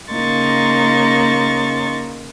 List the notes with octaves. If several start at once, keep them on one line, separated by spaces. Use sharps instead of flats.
C#3 A#3 D#4 C6 C#6 A6